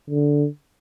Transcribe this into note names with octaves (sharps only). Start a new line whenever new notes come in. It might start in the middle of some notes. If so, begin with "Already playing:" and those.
D3